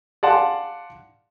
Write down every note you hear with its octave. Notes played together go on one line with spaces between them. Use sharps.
D5 F5 F#5 A5 C6